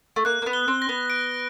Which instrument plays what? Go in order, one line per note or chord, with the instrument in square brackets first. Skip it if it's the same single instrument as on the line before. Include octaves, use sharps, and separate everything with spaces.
[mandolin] A3
[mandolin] A#3 [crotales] F#6
[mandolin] A#3
B3
[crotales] G7
[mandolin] C4
[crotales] A#6
[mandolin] B3
[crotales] D7